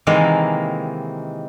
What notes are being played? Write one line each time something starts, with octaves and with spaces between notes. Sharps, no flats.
C3 D#3 E3 G#3 A#3